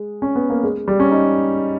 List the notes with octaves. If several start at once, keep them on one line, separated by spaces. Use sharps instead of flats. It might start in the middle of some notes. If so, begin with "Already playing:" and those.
Already playing: G#3
C#4
B3
A#3
G#3
G3
C#4
D#4